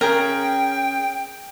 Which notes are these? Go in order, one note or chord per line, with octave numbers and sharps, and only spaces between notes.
C#4 G#4 A#4 G5